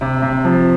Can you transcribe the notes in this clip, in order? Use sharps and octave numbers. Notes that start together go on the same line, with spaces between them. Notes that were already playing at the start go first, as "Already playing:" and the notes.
C3
C3
F3